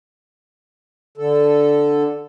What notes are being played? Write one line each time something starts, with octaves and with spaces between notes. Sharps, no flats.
D3 A4